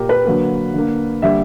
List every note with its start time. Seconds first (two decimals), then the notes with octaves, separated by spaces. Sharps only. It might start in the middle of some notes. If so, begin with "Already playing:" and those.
Already playing: A#2 A#3 G4 A#4
0.09 B4
0.25 D3 F#3 A#3
0.74 D3 A#3
1.22 D3 G3 A#3 E5